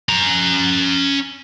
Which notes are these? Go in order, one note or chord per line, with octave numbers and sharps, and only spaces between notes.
C#4 A#5